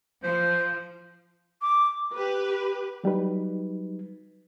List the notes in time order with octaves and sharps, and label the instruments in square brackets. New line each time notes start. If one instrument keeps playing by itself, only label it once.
[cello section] F3 [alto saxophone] C5
[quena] D6
[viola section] G4 B4
[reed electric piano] F#3 G3 D#4 B4